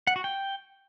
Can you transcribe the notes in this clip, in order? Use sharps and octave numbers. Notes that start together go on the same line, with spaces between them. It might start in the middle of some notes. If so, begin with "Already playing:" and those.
F#5
F#4
G5